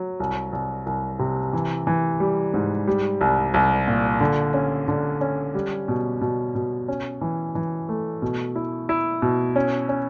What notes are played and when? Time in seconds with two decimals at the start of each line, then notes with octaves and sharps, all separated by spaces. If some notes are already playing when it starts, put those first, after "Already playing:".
Already playing: F#3
0.20 C2
0.53 C2
0.86 C2
1.19 C3
1.53 E3
1.87 E3
2.20 G3
2.54 G#2
2.87 G3
3.21 C2
3.54 C2
3.88 A#2
4.21 D3
4.54 C#4
4.88 D3
5.21 C#4
5.54 G3
5.88 B2
6.21 B2
6.55 B2
6.88 C#4
7.21 E3
7.55 E3
7.89 A3
8.22 B2
8.56 E4
8.89 E4
9.22 B2
9.56 C#4
9.89 C#4